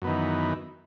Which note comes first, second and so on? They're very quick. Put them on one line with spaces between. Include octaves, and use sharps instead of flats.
F#2 B3 D#3 E3